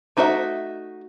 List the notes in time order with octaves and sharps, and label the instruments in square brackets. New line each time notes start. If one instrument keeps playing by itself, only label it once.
[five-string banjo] A3 D#4 F#4 C5 E5